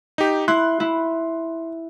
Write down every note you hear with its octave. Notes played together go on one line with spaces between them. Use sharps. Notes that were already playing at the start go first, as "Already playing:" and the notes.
D#4 G4
E4 C6 F#6
E4